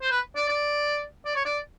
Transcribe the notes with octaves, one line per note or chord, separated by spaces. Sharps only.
C5
B4
D5
D5
D5
C#5
D5